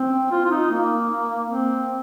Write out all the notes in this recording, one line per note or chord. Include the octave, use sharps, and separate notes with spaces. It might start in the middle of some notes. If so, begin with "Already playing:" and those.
Already playing: C4
F4
F4
D#4
A#3
C4